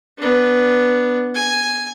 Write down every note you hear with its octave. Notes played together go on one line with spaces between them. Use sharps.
B3 D4
G#5